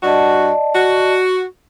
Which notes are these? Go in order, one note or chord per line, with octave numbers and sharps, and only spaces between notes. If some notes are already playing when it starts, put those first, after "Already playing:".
G2 F#4 D5 D#5 A5
F#4